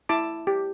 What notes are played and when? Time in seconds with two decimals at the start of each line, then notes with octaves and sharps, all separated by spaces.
0.09 E4 A5 D6
0.47 G4